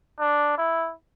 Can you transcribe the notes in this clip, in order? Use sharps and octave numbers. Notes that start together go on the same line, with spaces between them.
D4
E4